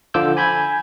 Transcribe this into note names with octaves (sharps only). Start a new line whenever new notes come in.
D3 F3 F4 D6 E6 G6
G#5 B5 G6 G#6